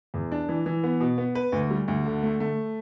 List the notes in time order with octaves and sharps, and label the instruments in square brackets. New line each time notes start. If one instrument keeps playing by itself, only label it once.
[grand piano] E2
D4
E3
E3
B3
B2
B3
B4
D2
G3
D2
D3
A3
A3